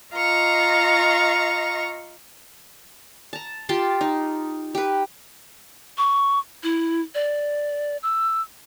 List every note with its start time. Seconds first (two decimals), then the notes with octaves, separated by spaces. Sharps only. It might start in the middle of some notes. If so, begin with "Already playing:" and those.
0.14 F4 D#5 F5 A#5 C#6
3.33 A5 A#5
3.69 F4 G4 A5 C6
4.01 D#4
4.75 G4 B4
5.98 C#6
6.63 E4
7.15 D5
8.03 E6